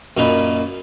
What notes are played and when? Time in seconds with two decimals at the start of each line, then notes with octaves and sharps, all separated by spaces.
0.17 F#2 A#2 D#4 B4